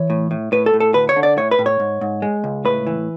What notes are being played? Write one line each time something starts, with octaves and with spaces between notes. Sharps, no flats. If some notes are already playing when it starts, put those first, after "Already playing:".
Already playing: E3 C#5
A2
A2
A2 B4
A4
A2
A4
D2 B4
C#5
D3
D5
A2 C#5
B4
A2
C#5
G#2
G#2
G#3
C#2
A2 B4
E3